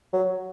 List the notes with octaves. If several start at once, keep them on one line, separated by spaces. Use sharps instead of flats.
F#3